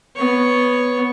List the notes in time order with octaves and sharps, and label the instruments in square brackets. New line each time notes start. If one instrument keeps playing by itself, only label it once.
[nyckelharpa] B3 C#5